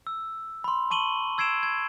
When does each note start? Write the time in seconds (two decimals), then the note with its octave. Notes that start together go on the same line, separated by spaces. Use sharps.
0.07 E6
0.64 B5 C6
0.90 A5 C#6 D#7 F#7 G7
1.38 E6 G#6 C7 D7 E7
1.63 G#6